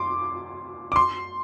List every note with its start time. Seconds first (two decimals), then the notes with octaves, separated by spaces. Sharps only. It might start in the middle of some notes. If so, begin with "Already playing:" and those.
Already playing: C6 D6
0.92 D6
0.96 C6